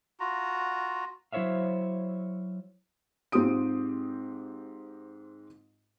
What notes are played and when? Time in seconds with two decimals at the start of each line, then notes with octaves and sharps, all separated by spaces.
0.20 F4 F#4 A#5
1.32 F#3 E4 C5 C#5 E5 F5
3.32 G#2 C4 F4 G4 D#6 D7